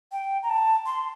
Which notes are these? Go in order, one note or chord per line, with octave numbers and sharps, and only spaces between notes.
G5
A#5
A5
C6